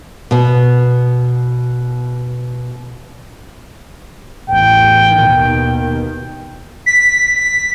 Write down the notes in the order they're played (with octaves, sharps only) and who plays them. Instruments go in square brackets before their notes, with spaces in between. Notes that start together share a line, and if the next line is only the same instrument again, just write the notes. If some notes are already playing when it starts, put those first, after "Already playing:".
[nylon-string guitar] B2 B3
[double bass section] A1 E2 [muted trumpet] G5
[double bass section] D#2 B2 D#3
[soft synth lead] B6